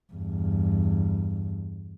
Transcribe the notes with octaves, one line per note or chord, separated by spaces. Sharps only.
E2 G2